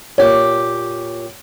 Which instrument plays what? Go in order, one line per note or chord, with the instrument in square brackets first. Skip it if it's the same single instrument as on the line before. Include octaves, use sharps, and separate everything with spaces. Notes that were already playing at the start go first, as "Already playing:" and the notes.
[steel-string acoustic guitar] A#2 G4 [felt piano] C#5